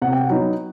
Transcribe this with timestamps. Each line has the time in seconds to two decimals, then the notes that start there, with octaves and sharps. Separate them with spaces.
0.02 C3 F#5
0.12 G5
0.24 F#5
0.30 F#3 B3 D#4